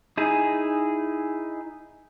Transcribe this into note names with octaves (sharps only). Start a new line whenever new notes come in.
D#4 E4 G#4 G#5